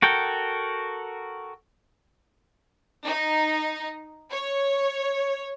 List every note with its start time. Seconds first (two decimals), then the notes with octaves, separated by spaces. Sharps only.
0.02 F#4 A4 A#4 G5
3.06 D#4
4.30 C#5